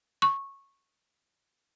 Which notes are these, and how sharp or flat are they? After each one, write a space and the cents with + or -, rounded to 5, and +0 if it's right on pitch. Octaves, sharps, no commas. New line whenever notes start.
C#6 -10